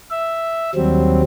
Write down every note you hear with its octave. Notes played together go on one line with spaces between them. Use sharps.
E5
D#2 F#3 G3 C4